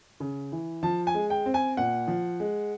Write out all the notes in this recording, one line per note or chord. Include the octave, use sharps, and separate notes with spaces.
C#3
E3
F3 A5
G#5
G#3
G5
C4
G#5
A#2 F#5
F3
G#3